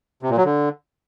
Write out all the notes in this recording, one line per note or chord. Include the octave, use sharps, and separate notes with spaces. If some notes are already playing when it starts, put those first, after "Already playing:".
C3
A#2
F#3
D3